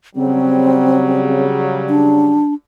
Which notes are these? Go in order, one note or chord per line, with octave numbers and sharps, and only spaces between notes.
C#3 F#3 G3 C4
D4